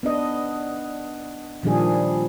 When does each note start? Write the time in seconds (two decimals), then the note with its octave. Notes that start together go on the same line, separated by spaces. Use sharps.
0.03 B3 D4 D#5
1.63 A#2 D#3 F3 G3 D4 G#4